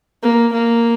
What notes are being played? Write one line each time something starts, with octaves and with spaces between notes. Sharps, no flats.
A#3
A#3